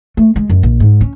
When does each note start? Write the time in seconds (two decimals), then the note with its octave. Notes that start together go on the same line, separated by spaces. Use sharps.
0.17 A3
0.36 G#3
0.50 F#2
0.63 A#1
0.80 G#2
1.01 C#4